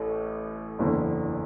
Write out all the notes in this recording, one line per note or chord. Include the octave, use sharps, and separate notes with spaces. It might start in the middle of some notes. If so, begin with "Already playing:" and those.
Already playing: A1 A2 A4
F#1 E2 D3